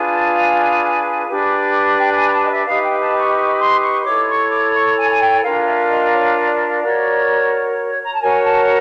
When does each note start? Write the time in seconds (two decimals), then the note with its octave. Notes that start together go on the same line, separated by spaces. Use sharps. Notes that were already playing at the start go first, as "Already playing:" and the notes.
Already playing: D4 F4 G#4 B4
0.09 A#5
0.13 A5
0.36 G#5
1.28 D4 G4 B4
1.98 G5
2.14 G#5
2.28 A#5
2.32 A5
2.44 D#5
2.50 E5
2.67 D#4 G4 B4 F5
2.84 G5
3.01 A5
3.19 C#6
3.36 C#6
3.60 C6
3.82 C#6
4.05 E4 A4 C#5 D6
4.28 C#6
4.51 D6
4.74 C#6
4.97 G#5
5.09 G#5
5.20 G5
5.43 D4 F4 A#4 F5
5.66 E5
5.89 D#5
6.14 C#5
6.47 D5
6.82 F#4 A#4 C#5
8.03 A#5
8.12 A5
8.21 F#4 A#4 C#5 G#5
8.43 A5